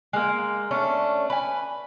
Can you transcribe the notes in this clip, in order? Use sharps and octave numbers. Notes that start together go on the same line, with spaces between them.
G#3 A#3
A3 C#4 D4
B4 G#5